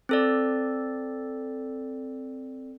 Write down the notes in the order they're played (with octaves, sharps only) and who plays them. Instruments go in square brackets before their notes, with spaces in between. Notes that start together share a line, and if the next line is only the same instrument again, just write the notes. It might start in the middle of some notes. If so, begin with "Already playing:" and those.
[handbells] C4 A4 D5